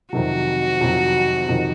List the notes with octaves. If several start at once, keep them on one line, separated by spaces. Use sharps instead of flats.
F2 C3 D#3 F#3 F#4
F2 C3 D#3 F#3
F2 C3 D#3 F#3